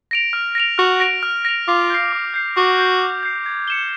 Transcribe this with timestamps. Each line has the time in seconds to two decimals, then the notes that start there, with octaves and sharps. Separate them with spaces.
0.11 A#6 D7 F7
0.33 F6
0.55 A#6 D7 F7
0.78 F#4 F6
1.00 A#6 D7 F7
1.23 F6
1.45 A#6 D7 F7
1.68 F4 D6
1.90 G6 C7
2.13 D6
2.34 G6 C7
2.56 F#4 D6
2.78 G6 C7
3.01 D6
3.23 G6 C7
3.46 G#6
3.68 C#7 E7 G7